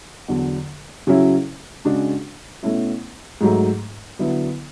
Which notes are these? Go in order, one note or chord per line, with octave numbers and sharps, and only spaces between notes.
E2 D3 F#3
C#3 F#3 C#4 E4
C#3 G#3 D4 F#4
B2 A3 C#4 E4
G#2 F#3 A3
D3 F#3 B3 E4